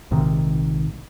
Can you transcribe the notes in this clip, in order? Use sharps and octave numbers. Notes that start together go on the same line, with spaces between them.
A#1 G#2 C3 D#3